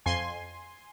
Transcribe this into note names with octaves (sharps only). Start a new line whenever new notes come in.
F2 G#5 C6